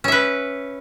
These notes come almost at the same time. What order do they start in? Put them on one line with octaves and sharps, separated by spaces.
C#4 E5 B4